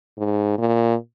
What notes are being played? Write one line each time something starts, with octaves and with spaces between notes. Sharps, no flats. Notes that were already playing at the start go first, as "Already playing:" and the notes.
G#2
A#2